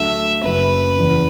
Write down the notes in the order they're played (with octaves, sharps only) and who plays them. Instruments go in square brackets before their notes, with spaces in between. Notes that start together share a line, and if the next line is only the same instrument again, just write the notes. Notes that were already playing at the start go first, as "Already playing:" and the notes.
Already playing: [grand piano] D2 D3 F#3 A3 [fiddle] E5
[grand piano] F#1 F#2 C#3 F#3 [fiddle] B4
[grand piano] E2 C#3 E3 B3